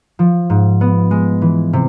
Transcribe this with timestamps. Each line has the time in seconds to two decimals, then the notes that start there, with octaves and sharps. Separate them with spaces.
0.19 F3
0.50 G#2
0.81 B3
1.11 G#3
1.42 E3
1.73 C3